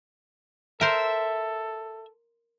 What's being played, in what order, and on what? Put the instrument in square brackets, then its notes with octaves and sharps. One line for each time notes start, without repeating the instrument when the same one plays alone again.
[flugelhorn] A4 [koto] A#4 C5 [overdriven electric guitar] E5